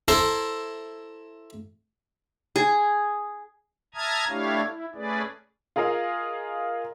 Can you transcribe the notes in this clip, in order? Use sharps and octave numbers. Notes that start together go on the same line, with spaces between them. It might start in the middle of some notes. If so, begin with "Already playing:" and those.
E4 A4 C5 A#5 C6
G#4
E5 A5 A#5 D#6 F6 G#6
A3 D4 E4 G4 C#5 F5
E4
A3 C#4 G#4 B4 D5
F4 G#4 A#4 D#5 F5